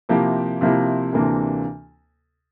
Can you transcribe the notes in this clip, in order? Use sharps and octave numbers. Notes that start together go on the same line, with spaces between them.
C3 F3 A#3 E4 G4
C3 F3 A#3 E4 G4
D2 C3 E3 A#3 D4